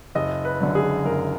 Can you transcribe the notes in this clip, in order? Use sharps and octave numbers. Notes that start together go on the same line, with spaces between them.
F#1 D#5
B4
F#2 D3
G#4
F#1 A#4